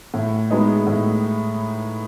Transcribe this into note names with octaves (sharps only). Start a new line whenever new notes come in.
A2
G#3 B3 D#4 F#4
A2